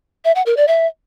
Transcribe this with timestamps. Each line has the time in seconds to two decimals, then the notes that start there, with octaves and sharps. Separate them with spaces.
0.25 E5
0.35 F#5
0.46 A#4
0.57 D5
0.67 E5